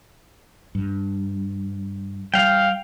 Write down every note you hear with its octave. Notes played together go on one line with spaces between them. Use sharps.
G2
G3 F5 G5